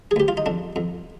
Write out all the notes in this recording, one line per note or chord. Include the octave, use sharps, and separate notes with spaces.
G#4
D2 G4
F4
D#4
F2 D4
F2